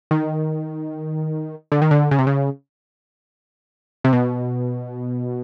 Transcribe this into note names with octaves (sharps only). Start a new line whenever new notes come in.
D#3
D3
D#3
D3
C#3
C3
C#3
C3
B2